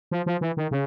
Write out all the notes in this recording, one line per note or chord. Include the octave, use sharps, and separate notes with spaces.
F3
F3
E3
D#3
C#3